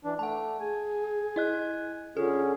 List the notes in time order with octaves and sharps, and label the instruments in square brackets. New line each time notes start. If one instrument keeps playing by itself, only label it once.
[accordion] E3 D4
[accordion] A3 [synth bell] F#5 A5
[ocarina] G#4 [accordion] G#5
[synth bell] E4 D#5 F#6
[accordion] D3 C#4 G#4 [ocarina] F4 [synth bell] A4